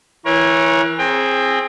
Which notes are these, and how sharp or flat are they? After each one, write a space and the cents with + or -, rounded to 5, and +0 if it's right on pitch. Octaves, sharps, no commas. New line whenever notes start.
E3 +0 A#4 +35 C#5 -15
C4 +20 G#4 +0 G5 +20